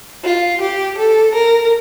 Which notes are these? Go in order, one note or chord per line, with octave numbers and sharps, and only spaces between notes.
F4
G4
A4
A#4